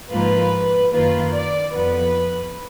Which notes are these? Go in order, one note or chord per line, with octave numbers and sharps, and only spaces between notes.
G#2 F3 A#3 F4 B4
F#2 D#3 A#3 F4 B4
D5
F2 F3 B3 B4